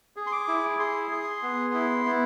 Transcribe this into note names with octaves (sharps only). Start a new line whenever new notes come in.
G#4
C6
D6
E4
G#4 C6
G#4
B3
E4
B3